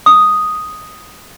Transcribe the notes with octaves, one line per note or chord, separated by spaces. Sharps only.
D#6